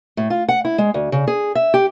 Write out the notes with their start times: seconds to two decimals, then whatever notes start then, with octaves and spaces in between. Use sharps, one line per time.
0.17 A2
0.30 F4
0.48 F#5
0.65 E4
0.78 G#3
0.94 D2
1.12 C#3
1.27 G#4
1.55 E5
1.74 G4